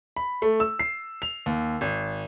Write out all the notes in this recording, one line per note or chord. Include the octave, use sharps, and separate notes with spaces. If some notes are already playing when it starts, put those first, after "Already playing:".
B5
A3
E6
C7
F7
D#2
G#1